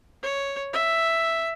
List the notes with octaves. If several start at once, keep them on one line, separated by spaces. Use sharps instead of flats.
C#5
E5